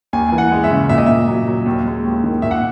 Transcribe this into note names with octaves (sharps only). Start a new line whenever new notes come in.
D#2 G#5
E3 G#5
F#5
G#3
E5
C#3
A#2 E5
D#5
A#2 E5
F#3
F#3
D#2
G#3
D#2
D#3
A#2 E5
F#5